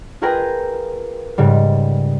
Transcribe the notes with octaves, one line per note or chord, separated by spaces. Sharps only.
F4 G#4 A#4 B4 G5 A#5
G#2 C#3 G3